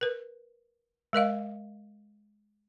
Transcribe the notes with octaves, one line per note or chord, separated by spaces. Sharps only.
A#4 B4
G#3 A#4 D#5 F5